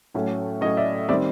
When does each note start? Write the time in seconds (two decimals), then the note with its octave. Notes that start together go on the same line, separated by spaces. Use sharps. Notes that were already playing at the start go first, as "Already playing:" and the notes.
0.14 A2 F#3 A3 C#4
0.61 A2 F#3 A3 C#4 C#5 D#5
0.77 D5 E5
1.09 D#3 G3 C4 D5 E5